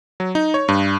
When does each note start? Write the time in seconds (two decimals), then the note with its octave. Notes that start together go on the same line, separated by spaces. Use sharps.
0.20 F#3
0.35 D#4
0.54 C#5
0.68 G2